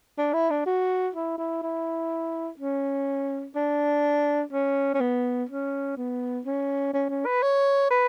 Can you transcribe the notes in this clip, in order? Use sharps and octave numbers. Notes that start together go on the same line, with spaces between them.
D4
E4
D4
F#4
E4
E4
E4
C#4
D4
C#4
C#4
B3
C#4
B3
C#4
C#4
C#4
B4
C#5
B4